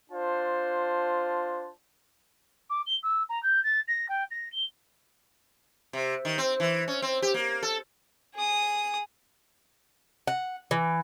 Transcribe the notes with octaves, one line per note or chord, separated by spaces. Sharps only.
D4 F4 C5 A5
D6
G7
E6
A#5
G6
A6
A#6
G5
A#6
G7
C3
D#3
C4
E3
C#4
C4
G4
A#3
A4
G#4 D#6
F#5
E3